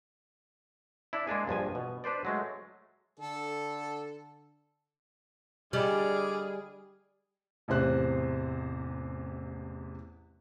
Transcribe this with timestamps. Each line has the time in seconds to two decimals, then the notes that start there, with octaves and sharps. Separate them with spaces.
1.13 D4 E4
1.27 G#3 A#3 D4 G#4
1.47 A#1 G2 F3 G#5
1.75 B2
2.04 D4 B4 C5 D5
2.25 F#3 G#3 A3
3.20 D3 A4
5.73 D3 G3 G#4 D5 D#5 G5 B5 F6
7.68 A1 E2 C3 C5 F#6